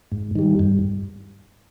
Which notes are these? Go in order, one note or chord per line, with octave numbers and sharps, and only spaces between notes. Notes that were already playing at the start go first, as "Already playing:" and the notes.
G#2
D#3 G3
G2